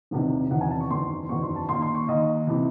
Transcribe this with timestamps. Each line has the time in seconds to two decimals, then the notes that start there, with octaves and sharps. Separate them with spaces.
0.11 E1 E2 C3 D#3
0.50 E1 E2 C3 D#3 F#5
0.61 G#5
0.71 A5
0.80 C#6
0.90 F#1 E2 D#3 C6
1.29 F#1 E2 D#3 C#6
1.43 C6
1.56 A5
1.69 D#2 D#3 C6
1.82 C6
1.95 C#6
2.08 D#2 D#3 D#5
2.47 C3 E3